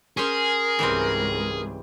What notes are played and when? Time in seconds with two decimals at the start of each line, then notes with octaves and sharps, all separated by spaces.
0.17 C#4 G#4 A#4 C5 C#5
0.79 C#2 G#2 E3 G3 C4